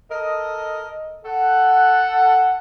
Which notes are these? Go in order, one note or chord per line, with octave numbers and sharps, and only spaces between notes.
A4 A#4 D#5
A4 F#5